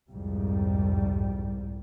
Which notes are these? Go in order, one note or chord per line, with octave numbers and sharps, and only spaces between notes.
C2 F2 G#2 G3